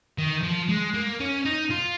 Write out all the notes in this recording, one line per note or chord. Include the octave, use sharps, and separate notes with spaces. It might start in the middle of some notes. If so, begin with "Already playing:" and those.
D#3
F3
G#3
A#3
C#4
D#4
F4